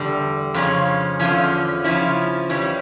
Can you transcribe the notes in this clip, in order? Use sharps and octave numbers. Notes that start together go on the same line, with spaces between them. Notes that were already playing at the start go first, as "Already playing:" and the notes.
Already playing: E2 D3 G3
F2 C#3 F3 C#4
E2 D3 F3 C#4
C#3 F3 C#4 E4
F2 E3 G3 C#4